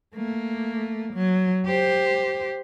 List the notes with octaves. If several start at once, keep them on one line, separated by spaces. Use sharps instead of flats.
A3 A#3
F#3
G4 C5